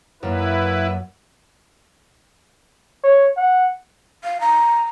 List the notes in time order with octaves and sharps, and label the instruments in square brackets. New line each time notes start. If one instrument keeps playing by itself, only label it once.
[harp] F#2 A#3 [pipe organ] E4 B4
[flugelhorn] C#5
F#5
[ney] F5
A#5